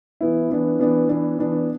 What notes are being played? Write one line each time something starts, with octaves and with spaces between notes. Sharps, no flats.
E3 B3 E4
E3 B3 D4
E3 B3 D4
E3 B3 D4
E3 B3 D4